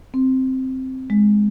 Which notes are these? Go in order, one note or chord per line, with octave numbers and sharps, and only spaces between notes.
C4
G#3